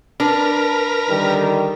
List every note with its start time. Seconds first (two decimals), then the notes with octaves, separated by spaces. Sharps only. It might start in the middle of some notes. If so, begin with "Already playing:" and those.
0.20 D4 A#4 B4 F6
1.09 D3 D#3 G3